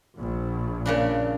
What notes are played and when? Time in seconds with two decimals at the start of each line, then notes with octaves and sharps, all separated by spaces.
0.17 A#1
0.86 A#2 C#3 D4